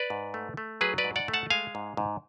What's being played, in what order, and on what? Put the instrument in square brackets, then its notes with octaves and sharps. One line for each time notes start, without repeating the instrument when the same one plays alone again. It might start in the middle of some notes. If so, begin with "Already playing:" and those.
Already playing: [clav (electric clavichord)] B4 D5
G#2
A3
A3
F#3 G#4 B4
B4 D5
G#2
D5 F#5
A3
F#5 A5
G#3 F5 G#5
G#2
G#2